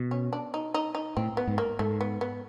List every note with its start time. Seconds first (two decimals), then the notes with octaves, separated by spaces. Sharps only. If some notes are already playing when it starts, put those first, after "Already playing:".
Already playing: B2
0.11 C#4
0.33 D4
0.54 D#4
0.74 D#4
0.95 D#4
1.17 A2 C4
1.37 B3
1.47 G#2
1.58 A#3
1.79 G#2 A3
2.01 B3
2.21 B3